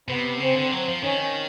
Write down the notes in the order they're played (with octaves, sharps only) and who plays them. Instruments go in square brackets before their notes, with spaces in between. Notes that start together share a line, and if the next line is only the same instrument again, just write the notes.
[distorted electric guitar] C3 [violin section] B3
[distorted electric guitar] C#3 [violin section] C4
[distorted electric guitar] D3
F#3
F3
[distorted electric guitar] D#3 [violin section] C#4